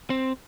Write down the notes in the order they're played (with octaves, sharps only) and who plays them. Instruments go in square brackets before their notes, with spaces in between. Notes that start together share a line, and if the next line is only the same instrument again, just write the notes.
[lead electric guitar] C4